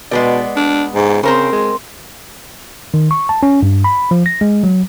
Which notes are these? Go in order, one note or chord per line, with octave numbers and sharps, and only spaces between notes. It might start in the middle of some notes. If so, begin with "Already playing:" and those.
B2 G#3 B3 D5
D4
G#2
C#3 C4 A#4 C5
G#3
D#3
C#6
A5
C#4
G2
B5
F3
A#6
G#3
F#3